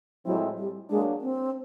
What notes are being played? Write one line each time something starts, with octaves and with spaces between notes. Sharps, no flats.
A2 F3 F#3 G#3 C4 E4
G3
F#3 G#3 A#3 D4
C4